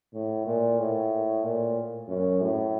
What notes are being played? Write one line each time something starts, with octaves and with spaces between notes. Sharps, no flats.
A2
A#2
A2
A#2
F#2
A2